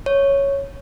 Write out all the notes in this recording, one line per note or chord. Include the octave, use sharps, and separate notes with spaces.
C#5